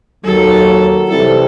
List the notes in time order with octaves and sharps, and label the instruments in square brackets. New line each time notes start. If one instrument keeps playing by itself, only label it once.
[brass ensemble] D#2 D#3 F#3 [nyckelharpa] A4
[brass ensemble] C3 E3 G3 C4 E4 [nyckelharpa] A4